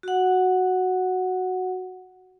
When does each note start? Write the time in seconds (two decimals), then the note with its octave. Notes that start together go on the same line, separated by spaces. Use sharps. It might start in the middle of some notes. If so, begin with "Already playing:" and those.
0.03 F#4 F#5